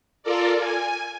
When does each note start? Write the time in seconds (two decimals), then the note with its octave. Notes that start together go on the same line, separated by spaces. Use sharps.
0.23 F4 A4 A#4 D5
0.59 G#5